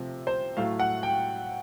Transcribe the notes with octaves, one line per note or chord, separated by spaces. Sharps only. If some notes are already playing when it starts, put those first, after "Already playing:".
Already playing: C3 F3 A3 C4
C5
A2 F#3 A3 F5
F#5
G5